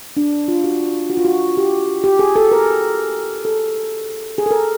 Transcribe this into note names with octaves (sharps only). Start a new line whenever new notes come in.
D4
F4
F#4
F#4
F4
F#4
G4
G4
G#4
A4
A#4
A4
G#4
A4
A#4